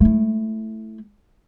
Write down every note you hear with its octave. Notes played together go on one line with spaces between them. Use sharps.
A3 E4